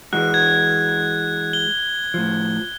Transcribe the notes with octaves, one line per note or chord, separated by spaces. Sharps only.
E3 G#3 F#4 F#6
G#6
G7
A2 F3